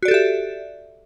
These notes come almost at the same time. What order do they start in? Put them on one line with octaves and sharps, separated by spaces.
F#4 D5 A4 G4 E5